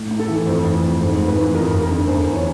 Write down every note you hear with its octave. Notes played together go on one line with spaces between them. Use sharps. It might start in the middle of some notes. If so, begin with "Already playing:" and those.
Already playing: A2
A2
A4
E3
F2 C5
E3
F2
G#2 C5
G#2
B4
E3
F2 A#4
F2
A#4
D3
E2 C5
E3
C#5